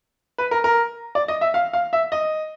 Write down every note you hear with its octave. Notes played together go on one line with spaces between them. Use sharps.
B4
A#4
A#4
D5
D#5
E5
F5
F5
E5
D#5